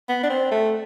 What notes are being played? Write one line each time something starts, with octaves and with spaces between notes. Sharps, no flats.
B3
D4
C4
A3